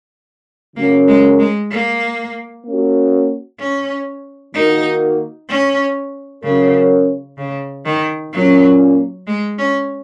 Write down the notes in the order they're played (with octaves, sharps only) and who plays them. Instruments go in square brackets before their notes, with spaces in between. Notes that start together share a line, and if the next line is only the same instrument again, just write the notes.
[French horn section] C#3 F#3 C#4 A#4 [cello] A#3
[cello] G#3
G#3
A#3
[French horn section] A#3 C#4 F#4
[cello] C#4
[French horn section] D#3 A#3 F#4 A#4 [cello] D#4
[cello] C#4
[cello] C#3 [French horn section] F#3 C#4 A#4
[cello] C#3
D#3
[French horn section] A#2 A#3 C#4 [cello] F#3
[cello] G#3
C#4